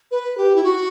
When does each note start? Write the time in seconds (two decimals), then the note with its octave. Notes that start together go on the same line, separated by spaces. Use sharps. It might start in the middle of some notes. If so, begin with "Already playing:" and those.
0.11 B4
0.38 G4
0.55 E4
0.64 F#4